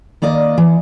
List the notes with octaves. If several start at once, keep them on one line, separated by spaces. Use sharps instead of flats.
D#3 A#3 D5 D#5
E3